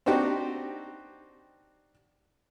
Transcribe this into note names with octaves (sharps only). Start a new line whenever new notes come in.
C4 D4 D#4 F#4 G4